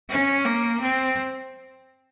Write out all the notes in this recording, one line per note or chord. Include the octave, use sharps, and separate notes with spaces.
C#4
A#3
C4